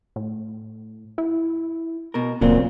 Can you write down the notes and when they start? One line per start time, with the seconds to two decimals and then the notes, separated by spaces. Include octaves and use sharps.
0.16 A2
1.18 E4
2.14 B2 A#4
2.41 D1 A#2 C#3 F#3 C4